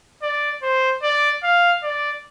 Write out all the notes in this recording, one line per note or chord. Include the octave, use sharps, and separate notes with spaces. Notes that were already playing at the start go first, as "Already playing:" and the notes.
D5
C5
D5
F5
D5